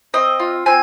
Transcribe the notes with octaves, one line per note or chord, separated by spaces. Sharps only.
C4 D#5
F4
C4 G#5